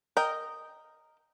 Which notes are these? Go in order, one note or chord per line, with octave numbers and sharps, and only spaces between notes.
A#4 D#5 G5